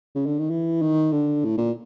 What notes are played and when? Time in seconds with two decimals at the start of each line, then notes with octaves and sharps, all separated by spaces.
0.15 C#3
0.26 D3
0.39 D#3
0.50 E3
0.82 D#3
1.12 D3
1.45 A2
1.58 A#2